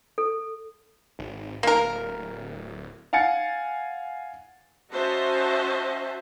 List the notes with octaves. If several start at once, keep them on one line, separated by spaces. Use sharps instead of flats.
A4
G#1
D1 A#3 A#4
F5 F#5 G#5 A6 C#7
C#4 F#4 C5 D#5 E5 A5